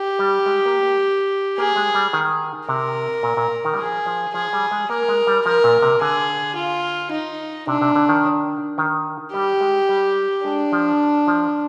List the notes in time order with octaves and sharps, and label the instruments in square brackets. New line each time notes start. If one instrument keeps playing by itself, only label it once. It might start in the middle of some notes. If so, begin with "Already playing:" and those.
Already playing: [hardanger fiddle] G4
[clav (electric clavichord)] G3
G#3
A#3
A#3
[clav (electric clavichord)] A#3 [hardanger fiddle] G#4
[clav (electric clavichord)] G#3
G3
D#3
[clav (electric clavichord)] C3 [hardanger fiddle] A#4
[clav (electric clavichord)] A#2
A#2
D#3
G3
[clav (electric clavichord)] F3 [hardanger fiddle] G#4
[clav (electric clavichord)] F3
[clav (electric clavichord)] F3 [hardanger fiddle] G#4
[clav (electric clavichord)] G3
G#3
[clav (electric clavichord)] A#3 [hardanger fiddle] A#4
[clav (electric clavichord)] G#3
G3
[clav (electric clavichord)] F3 [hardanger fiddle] A#4
[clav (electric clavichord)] A#2
C3
[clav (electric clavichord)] D3 [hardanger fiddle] G#4
[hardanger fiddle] F4
D#4
[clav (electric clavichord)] C3 [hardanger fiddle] D4
[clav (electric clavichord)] C3
D3
D#3
D#3
[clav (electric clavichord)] G3 [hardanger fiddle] G4
[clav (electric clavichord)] G#3
G3
[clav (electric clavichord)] G#3 [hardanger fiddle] D4
[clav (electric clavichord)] F3
F3